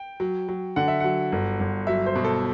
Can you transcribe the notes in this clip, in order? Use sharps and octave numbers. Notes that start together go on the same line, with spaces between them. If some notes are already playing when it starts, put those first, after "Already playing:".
Already playing: G5
F#3
F#3
D3 F#5
E5
F#3 F#5
G1
G1
F#3 E5
C5
B2
A4